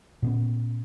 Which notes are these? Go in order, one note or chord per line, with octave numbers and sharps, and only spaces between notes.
A#2 B3 C#4